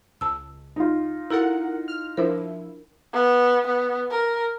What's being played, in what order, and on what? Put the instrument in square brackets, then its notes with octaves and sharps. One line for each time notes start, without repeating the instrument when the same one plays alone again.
[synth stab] C#2 [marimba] A5 E6
[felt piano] D#4 F4
[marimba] E4 F#4 A4 [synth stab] A#4 F#5
[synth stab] F6
[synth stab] F3 E4 [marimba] D4 A#4
[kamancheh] B3
B3
A#4